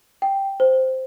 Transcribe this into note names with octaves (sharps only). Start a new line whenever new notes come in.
G5
C5